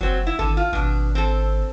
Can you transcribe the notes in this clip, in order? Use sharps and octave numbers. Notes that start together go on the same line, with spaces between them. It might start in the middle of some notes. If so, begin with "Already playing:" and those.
F#1 F#3 C4
E4
G#1 D3 A4
F4
G#1 B2 D4
C4 A4